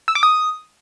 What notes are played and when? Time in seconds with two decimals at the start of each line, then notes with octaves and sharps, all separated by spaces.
0.08 E6
0.15 D6
0.23 D#6